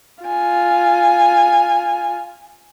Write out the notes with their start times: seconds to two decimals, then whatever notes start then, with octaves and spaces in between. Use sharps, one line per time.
0.24 F4 G#5